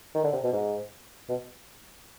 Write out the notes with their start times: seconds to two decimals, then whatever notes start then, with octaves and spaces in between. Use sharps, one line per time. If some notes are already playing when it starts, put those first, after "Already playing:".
0.14 D#3
0.24 D3
0.33 C3
0.43 B2
0.52 G#2
1.29 B2